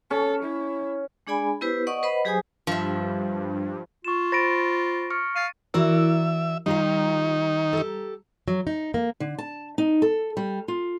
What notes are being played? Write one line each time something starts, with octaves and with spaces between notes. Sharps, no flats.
C#4 A4
E4
G#3 D4 G#4 D5 G#5 B5
B3 E4 G4 B4 C5
D5 D#5 F#5 C#6 D#6
B4 C5 D#5 F#5 B5
F#3 G4 G#4 C5 G#5 D#6
G2 F3 E5
F4 C#6 E7
C5 B5 A6 A#6 D7
C#6 F6 C#7
F5 A6 D#7
E3 E4 F#4 A#4 D5 E5 E6
D#3 G3 D#4 F4 G4 F5 A#5
G4 A4
F#3
D#4
A#3
D3
A5
D#4
A4
G3
F4